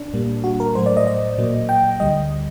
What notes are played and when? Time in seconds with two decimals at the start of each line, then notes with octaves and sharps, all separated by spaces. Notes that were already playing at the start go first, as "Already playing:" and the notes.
Already playing: D4
0.14 A#2 G3 A#3
0.44 F#4
0.60 A#4
0.75 A2 F#3 A3 C5
0.86 D5
0.97 D#5
1.07 D#5
1.38 A#2 F#3 A#3
1.69 G5
2.00 D2 D3 G3 D#5